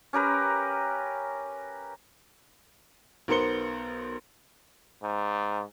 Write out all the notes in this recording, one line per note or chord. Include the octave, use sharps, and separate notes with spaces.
C#4 G4 A#4 B4
B1 B3 A#4 C5 C#7 G7
G#2